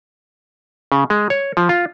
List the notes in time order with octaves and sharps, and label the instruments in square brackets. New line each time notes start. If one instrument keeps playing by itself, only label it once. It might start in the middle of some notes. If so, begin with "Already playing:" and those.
[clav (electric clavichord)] C#3
G#3
C#5
F3
F4